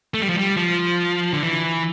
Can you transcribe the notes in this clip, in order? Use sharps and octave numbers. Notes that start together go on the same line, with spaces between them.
A3
G3
F3
G3
F3
D3
E3